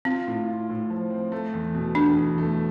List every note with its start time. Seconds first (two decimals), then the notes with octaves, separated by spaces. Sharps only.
0.05 C4 F4
0.27 A2
0.48 F4
0.69 A2
0.90 F3
1.10 C4
1.32 A3
1.53 E2
1.75 B2
1.95 E2 D4
2.17 E2
2.38 A3